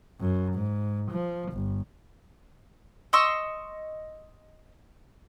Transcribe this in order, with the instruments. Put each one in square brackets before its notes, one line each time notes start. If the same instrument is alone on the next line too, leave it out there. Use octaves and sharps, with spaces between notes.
[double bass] F#2
G#2
F3
G1
[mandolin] D#5 C6 C#6 E6